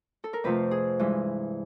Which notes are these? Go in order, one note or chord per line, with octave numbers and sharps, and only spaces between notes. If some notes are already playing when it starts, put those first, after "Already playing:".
A4
A#4
F2 C3 F3 A3 B4
G#4
G2 E3 G#3